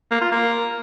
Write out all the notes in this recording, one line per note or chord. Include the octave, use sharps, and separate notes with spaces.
A#3
F4
A#3